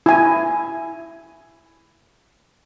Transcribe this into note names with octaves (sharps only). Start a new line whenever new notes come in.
E4 G#5